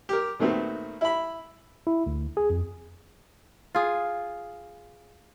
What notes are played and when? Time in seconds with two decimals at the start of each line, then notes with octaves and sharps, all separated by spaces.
0.09 G4 A#4
0.39 A#2 D#3 A3 B3 C4 F#4
1.01 E4 B5
1.87 E4
2.06 D2
2.37 G#4
2.50 F2
3.74 F4 G#4